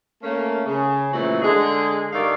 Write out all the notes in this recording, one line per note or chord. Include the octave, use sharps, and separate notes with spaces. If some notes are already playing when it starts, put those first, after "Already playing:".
A3 A#3 C#4
C#3
A#2 C#3 E3 F3 A3 F#4
D3 G#3 G#4
G2 D#3 A3 D#4 D5 F5